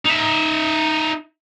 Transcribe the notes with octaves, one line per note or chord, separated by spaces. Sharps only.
D#4 E5